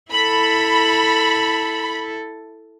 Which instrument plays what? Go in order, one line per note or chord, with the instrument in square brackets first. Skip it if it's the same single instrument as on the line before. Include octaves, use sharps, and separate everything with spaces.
[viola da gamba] E4 A4 [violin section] B5